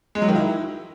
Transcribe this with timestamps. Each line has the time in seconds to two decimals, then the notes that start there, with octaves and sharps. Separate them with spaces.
0.15 G#3
0.22 F#3
0.29 D#3
0.35 E4